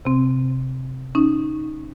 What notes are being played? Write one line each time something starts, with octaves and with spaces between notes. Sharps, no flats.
C3 C4
C#4 D#4